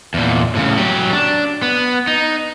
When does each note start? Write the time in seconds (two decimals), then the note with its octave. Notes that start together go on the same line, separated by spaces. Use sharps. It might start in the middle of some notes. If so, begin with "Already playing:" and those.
0.14 E2 A#2
0.55 A2 C#3
0.78 F#3 G4
1.12 D4
1.62 B3
2.07 D#4